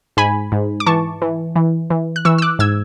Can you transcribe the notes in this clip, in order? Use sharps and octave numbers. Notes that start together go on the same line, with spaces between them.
G#2 G#5 B5
G#2
D6
E3 A5 C#6
E3
E3
E3
F#6
E3 C#6 E6
E6
D6 F#6
G#2 E6 G#6